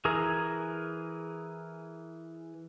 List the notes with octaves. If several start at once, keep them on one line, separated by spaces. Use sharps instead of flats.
E3 G#4 A#4